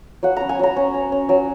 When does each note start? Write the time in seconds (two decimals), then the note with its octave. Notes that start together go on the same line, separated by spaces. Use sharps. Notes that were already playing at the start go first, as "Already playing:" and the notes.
0.23 F#3 F#5
0.37 C#4 A#5
0.49 G#5
0.59 F#3 A#5
0.76 C#4
0.94 C#4
1.12 C#4
1.29 F#3